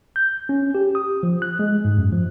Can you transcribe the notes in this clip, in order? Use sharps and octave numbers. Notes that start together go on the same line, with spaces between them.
G6
C#4
G4
D#6
F3
F#6
G#3
G#2
F#2
F3